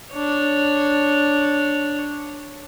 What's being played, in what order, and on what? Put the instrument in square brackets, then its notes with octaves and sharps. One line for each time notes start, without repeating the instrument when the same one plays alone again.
[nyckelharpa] D4 C#5